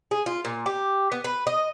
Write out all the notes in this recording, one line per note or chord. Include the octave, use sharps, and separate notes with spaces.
G#4
F4
A#2
G4
B3
B4
D#5